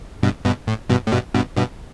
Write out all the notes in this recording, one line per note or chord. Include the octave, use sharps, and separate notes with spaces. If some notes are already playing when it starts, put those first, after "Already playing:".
G2 B2
G2 B2
A2
G2 B2
A2
G2 B2
G2 B2
G2 B2